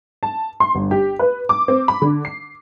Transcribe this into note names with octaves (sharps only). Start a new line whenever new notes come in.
A5
C6
G1
G4
B4
D6
C4
B5
D3
C7